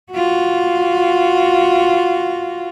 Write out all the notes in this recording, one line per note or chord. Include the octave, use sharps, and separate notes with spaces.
F4 F#4